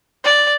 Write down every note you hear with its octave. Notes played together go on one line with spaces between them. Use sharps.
D5